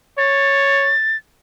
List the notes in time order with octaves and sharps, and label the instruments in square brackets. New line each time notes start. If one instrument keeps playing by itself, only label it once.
[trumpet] C#5 [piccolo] A6